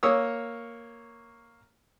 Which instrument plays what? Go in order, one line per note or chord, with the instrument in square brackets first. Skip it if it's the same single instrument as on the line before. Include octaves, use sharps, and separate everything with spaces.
[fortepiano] A#3 C#5 D#6 E6